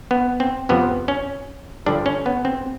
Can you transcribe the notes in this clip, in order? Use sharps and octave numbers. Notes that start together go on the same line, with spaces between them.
B3
C4
F2 C3 F3 B3
C#4
G2 D3 F3 D4
C#4
B3
C4